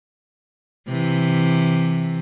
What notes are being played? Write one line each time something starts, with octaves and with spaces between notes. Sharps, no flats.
C3 E3